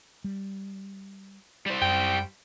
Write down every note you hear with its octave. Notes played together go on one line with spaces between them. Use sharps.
G3
G3 C5
F#2 G5